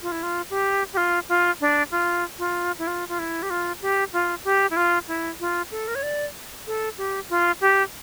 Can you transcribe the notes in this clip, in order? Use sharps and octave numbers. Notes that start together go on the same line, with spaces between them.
F4
E4
F4
G4
G4
F4
F4
D4
F4
F4
E4
F4
F4
E4
G4
F4
G4
F4
G4
E4
F4
E4
F4
A4
A#4
C#5
D5
A4
G4
F4
G4